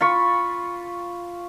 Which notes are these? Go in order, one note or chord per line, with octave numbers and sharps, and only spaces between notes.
F4 B5 C#6